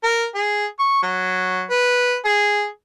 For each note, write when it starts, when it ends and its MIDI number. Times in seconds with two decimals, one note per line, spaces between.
0.04 0.25 70
0.35 0.66 68
0.79 1.02 85
1.03 1.63 54
1.70 2.17 71
2.25 2.67 68